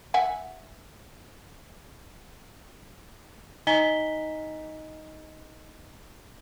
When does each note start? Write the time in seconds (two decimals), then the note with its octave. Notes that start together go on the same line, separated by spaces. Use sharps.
0.14 E5 F#5 G#5
3.67 D#4 D#5 G#5 A#5 B6 G7